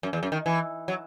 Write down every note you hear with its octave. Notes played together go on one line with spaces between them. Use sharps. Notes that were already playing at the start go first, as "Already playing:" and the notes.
F#2
E2
F#2
D#3
E3
F#3